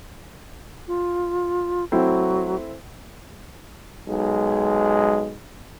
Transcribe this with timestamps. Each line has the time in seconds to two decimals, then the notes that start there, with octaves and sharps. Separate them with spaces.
0.88 F4
1.92 F#3 A3 C4 E4
4.08 B1 G#3